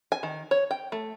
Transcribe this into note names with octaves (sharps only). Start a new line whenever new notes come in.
G#5
D#3
C#5
G5
A3